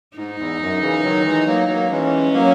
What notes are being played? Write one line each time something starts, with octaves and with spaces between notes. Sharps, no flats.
G#2 D#4
E2
F#2
C#3 E3
D#3 F#3
E3 G#3
F#3 A#3
F#3 A#3
E3 G#3 C#4
F#3 A#3